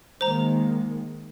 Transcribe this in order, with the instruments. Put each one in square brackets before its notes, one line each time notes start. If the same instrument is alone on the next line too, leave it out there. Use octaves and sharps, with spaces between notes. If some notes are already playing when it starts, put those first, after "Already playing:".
[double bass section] D#3 G#3 A#3 [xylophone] C5 A#5